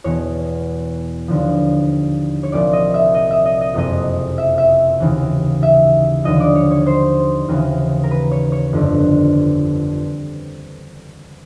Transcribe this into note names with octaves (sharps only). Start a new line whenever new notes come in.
E2 B2 C#5
D#2 D3 F3
C#5
C2 A#2 F3 D5
D#5
E5
D#5
E5
D#5
D#5
F#1 F2 C3 D#5
E5
E5
D#2 C#3 E3
E5
D#2 D3 F3 D#5
D5
C#5
C#5
C5
D#2 C#3 E3
A#4
B4
C#5
C#5
G1 F2 D3